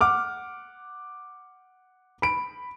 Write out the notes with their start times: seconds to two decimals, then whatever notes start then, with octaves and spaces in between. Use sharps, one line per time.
0.01 F#5 D6 F6
2.22 B5 D7